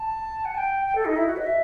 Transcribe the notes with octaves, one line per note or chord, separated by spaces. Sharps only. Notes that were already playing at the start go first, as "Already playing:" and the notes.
Already playing: A5
F#5
A5
G5
G5
A4
D#4
E4
F#4
D#5
E5